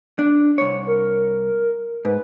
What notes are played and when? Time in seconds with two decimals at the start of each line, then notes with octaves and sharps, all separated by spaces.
0.19 D4
0.58 C2 C#5
0.87 A#4
2.05 G#2 B4